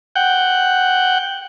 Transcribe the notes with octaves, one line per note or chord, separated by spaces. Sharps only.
F#5 G5